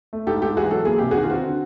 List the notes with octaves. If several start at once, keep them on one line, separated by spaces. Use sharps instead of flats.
A3
G#2 G4 A4
G#2 G4 A4
E3 F#4 G#4
F#3 A4
A#3 G#4
C3 G4
F#4 G#4
D#3
F4
C4 F#4
D3